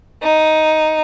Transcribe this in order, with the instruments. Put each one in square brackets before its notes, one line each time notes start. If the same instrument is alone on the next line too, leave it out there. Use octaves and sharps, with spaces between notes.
[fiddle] D#4